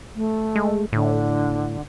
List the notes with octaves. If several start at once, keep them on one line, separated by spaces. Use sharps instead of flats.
A3
G#3
A2 D3